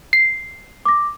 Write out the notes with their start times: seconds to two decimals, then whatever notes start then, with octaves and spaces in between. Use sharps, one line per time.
0.13 C7
0.85 D6 A#6